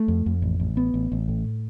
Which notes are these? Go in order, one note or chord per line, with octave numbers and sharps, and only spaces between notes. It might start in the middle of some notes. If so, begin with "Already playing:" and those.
Already playing: A3
F2
F2
A1
A1
B3
A1
A1
A2